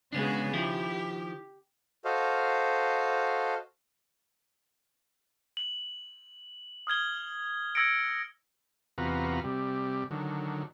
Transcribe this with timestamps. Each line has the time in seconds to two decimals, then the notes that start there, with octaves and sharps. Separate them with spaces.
0.13 C#3 G#3 B3 D4 F#4 G#4
0.53 D#3 F3 E4 G4
2.05 F#4 A4 C5 D#5 F5
5.57 F#7
6.87 D#6 F6 G#6 G7
7.75 E6 G#6 A#6 C#7 D7
8.98 E2 C3 F4 F#4 B4 A#5
9.44 C3 G3
10.11 D3 D#3 F#3